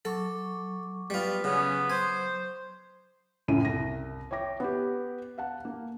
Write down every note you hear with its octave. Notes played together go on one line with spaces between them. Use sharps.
F#3 A4 C#6 D6
G3 B3 F4
C#3 B3 C#4
C5 G#5
C#2 F#2 A2 C#3 D#7
C2 A#6
C#5 E5 G5 D6 A#6
B3 G4
F5 F#5 A5
A#3